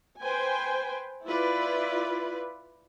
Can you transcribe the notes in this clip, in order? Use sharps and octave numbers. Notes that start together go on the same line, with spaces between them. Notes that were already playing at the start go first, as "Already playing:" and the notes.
B4 C5 G5 G#5
E4 F4 B4 D5